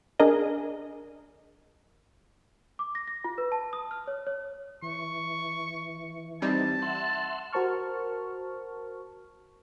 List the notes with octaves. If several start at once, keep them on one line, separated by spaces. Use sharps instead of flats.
D4 G#4 A#4 D#5
D6
A#6
A#6
F4
B4
A5
D#6
F6
C#5
C#5
E3 C#6
G3 C4 D#4 A5
E5 F#5 C6
F#4 A#4 C5 A5 C#6 F6